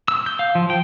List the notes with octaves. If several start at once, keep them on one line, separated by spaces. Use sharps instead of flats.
E6
G6
F5
F3
G5